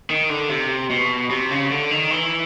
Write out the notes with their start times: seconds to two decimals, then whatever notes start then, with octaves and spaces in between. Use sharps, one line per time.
0.10 D#3
0.30 D3
0.49 C3
0.90 B2
1.30 C3
1.51 C#3
1.71 D3
1.91 D#3
2.11 E3